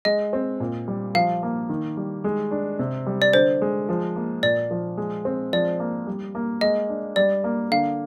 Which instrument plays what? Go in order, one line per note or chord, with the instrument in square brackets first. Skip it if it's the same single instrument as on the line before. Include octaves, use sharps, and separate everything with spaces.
[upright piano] G#3 [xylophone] D#5
[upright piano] C4
A#2
G3
[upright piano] F3 [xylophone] F5
[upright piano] A#3
D#3
G3
G#3
D4
C3
G3
[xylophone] D5
[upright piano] D3 [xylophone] C5
[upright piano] G#3
F3
A#3
[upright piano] A#2 [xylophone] D5
[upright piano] F3
G#3
C4
[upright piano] F3 [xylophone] D5
[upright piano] A#3
G3
A#3
[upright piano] G#3 [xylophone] D#5
[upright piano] D4
[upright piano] G3 [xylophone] D5
[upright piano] A#3
[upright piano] D3 [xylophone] F5